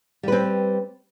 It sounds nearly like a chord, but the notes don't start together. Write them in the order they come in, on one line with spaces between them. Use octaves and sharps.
G3 B4 C4